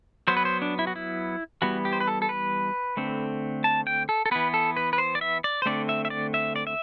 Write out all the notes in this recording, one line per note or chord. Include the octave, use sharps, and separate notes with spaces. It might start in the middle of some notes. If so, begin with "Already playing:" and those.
F#3 B3 C5
B4
C5
D4
E4
F#4
E4
E3 G3 B3 F#4
G4
C5
B4
A4
A4
B4
D3 A3 C4
A5
G5
A4
A4
E3 B3 B4
A4
B4
B4
C5
D5
E5
D5
C5
D3 A3 C4 D5
E5
E5
D5
E5
D5
E5